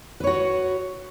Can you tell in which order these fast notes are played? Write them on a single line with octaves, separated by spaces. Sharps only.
B4 C#5 F#4